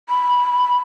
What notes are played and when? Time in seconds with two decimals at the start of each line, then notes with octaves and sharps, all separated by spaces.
0.09 B5